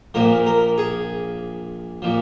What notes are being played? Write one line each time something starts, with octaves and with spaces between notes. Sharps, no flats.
A#1 A#2 F3 A#4
A#4
G#4
A#2 F3